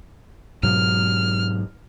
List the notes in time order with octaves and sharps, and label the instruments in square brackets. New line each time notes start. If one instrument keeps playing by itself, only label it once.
[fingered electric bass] G#2 B2 F#3 [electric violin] F6